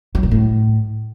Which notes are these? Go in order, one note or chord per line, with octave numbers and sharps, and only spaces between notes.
F#3
A#2
A2